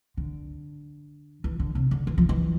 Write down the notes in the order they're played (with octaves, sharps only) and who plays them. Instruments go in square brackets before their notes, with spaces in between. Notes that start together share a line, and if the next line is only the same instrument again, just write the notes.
[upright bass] D3
E3
D3
C3
D3
E3
F3
E3